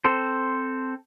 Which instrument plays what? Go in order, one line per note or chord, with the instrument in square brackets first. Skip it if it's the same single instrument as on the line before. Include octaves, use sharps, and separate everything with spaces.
[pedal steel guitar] C4 A4 C5